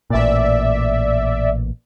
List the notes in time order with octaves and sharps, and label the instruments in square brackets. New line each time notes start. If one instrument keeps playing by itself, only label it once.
[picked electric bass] A1 A#2 [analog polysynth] D5 E5